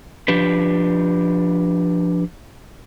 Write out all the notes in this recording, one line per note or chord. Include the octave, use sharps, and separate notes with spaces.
F3 D4 G4 B4